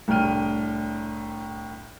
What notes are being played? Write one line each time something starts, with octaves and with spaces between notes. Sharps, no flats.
C2 A2 D4 G5 F6 D#7